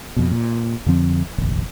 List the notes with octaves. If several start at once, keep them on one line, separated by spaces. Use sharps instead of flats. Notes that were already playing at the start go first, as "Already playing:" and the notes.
F2 B2
A#2
F2 D3 F3 C4
F1 A#1 D#2